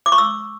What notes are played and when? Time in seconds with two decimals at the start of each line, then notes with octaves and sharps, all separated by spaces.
0.06 D6
0.12 C#6
0.18 E6